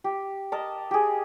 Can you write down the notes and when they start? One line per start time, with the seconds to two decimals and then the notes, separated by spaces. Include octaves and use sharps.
0.04 G4
0.52 A#4 D#5 A5
0.91 G4 G#4